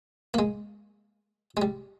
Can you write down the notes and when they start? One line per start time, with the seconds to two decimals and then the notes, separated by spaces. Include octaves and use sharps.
0.34 A#3
0.39 G#3
1.57 G#3
1.62 G3